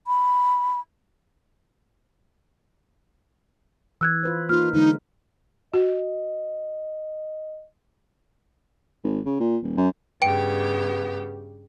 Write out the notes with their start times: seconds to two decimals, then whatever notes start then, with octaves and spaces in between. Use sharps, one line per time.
0.07 B5
4.01 E3 E6 F#6 G#6
4.23 F4 B4 C5
4.49 A#3 D#4 F4 F6
4.73 D3 E3 G#3 D#4
5.74 F#4 D#5
9.04 G#1
9.25 C#3
9.40 A#2
9.63 D#1
9.77 F#2
10.22 G2 C#3 B3 G4 G5 D7